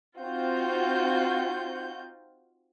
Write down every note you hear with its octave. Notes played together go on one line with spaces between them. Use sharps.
C4 D#4 F4 F#4 G6